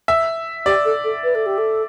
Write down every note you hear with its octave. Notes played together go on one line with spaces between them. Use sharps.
E5
G4 D5
A4
A4
B4
A4
G4
A4